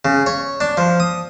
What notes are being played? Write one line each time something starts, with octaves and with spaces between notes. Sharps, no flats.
C#3
C#5
D4
F3
D#6